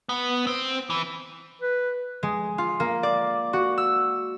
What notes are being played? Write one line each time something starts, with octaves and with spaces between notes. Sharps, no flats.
B3
C4
E3
B4
G#3
F4
A#3
D5
F#4
E6